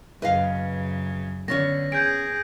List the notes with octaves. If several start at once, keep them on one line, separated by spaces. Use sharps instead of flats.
F#2 C#3 B4 D#5 F5
D3 B3 C#4 C#5 A#6
G#4 G6 D7